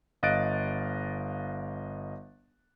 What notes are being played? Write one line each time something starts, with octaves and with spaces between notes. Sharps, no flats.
G1 D#5 F5 F#6 A6 D7